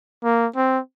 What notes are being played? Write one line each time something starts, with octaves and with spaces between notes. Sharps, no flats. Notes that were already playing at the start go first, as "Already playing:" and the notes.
A#3
C4